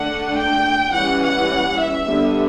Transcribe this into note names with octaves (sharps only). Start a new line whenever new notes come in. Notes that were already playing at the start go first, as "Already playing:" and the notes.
Already playing: D3 A3 D4 F#5
G5
E3 G3 C#4 F#5
F#5
E5
D3 G3 B3 D4